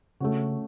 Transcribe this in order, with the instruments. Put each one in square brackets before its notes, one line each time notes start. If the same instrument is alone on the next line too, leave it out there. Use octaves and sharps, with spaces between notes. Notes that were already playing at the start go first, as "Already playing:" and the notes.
[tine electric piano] C#3 [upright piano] A3 C#4 F#4